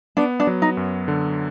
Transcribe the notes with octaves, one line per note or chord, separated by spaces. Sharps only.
B3 D4
D4
F#3
D#4
F#2
D3